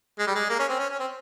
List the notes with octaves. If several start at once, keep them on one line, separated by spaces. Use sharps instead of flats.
G#3
G3
G#3
A#3
C#4
C4
C#4
C#4
C4